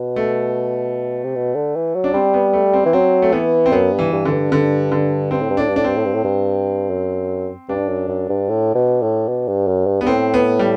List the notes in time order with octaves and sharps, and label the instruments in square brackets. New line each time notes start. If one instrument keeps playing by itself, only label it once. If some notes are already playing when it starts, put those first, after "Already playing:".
Already playing: [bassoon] B2
[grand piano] A3
[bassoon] C3
B2
D3
E3
F#3
[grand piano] D4
[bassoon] G3 [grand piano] C4
[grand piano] B3
A3
C4
[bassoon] E3
[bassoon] F#3 [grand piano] C4
[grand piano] A3
[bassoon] E3 [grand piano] B3
[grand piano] C4
[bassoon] F#2 [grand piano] B3
[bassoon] G2
[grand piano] E3
[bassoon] G2
[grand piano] D3
[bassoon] G2
[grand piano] D3
D3
[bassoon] G2 [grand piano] C4
[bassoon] A2
G2
[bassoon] A2 [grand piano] D4
[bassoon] G2
[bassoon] A2 [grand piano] D4
[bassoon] G2 [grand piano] C4
[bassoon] A2
G2
A2
G2
F#2
[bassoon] G2 [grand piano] D4
[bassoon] F#2
F#2
G2
A2
B2
A2
B2
G2
F#2
G2
[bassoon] G2 [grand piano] B3
[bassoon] A2 [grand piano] C4
[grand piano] B3
G3